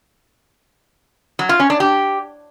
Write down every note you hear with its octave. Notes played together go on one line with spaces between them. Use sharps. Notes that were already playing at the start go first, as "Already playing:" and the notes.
F#3
F4
C#4
D4
G4